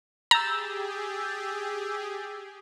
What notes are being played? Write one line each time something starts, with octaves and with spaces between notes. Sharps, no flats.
G4 G#4 A#5 E6 G6 A6